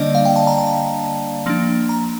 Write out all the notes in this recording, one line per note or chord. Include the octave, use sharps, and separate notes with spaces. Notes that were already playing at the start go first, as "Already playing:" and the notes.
Already playing: D3 G3 A#3 D4 D5 D#5
F5
G5
A5
A#5
A5
F3 A#3 D4
A#5